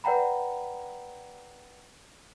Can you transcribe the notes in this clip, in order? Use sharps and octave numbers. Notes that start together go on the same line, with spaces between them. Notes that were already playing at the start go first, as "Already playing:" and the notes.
B4 D5 F#5 G5 A#5 B5